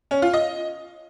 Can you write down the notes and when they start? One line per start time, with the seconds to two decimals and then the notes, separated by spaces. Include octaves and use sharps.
0.11 C#4
0.22 F4
0.34 D#5